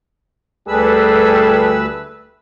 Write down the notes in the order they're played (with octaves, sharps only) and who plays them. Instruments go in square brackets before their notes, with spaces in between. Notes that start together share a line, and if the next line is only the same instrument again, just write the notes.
[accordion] D2 B4 E6 [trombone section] G3 G#4 A4